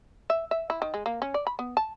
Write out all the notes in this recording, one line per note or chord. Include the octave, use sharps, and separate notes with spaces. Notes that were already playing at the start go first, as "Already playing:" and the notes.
E5
E5
E4
D#3
G#3
A#3
C#4
D5
B5
B3
A5